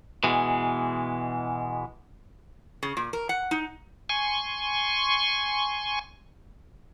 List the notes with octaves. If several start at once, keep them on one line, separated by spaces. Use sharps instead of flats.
B2 E3 G#3
C#3
A#2
A#4
F#5
D#4
G#5 C6 C#6